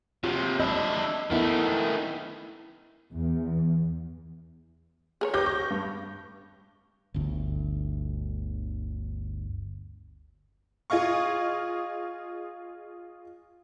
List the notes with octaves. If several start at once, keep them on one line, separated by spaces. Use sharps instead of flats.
C3 F#3 F4
G#3 D4 E4 D#5
D#3 A3 B3 D#4 E4
E2
G#4 A#4 C#5
G4 B4 D6 G6 A#6
C#6
G2
G1 D2
F4 G#4 D#5 F5 C#6